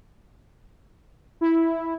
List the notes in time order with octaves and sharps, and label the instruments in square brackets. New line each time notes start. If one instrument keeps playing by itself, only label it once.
[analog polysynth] E4